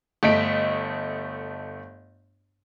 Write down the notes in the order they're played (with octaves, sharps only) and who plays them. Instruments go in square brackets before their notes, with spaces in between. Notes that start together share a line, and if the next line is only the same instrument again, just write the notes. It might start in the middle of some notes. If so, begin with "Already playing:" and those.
[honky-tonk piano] G1 A3 D#5 B6 D7